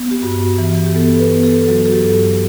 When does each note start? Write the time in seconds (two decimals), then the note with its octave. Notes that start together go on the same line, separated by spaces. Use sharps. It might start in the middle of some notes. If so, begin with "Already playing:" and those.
Already playing: B3
0.11 G4
0.22 G2 F#4
0.58 E3
0.86 G4
0.95 B3 A4
1.19 B4
1.32 B3
1.43 A4
1.68 F#3 F#4
1.86 A4
1.92 G4
2.04 G2
2.15 G4